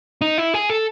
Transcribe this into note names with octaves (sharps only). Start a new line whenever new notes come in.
D#4
E4
G#4
A4